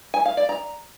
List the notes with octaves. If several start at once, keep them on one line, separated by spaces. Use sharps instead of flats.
G#5
F5
D5
A#5